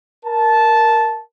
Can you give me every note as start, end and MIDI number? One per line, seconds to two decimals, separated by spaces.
0.25 1.21 70
0.25 1.21 81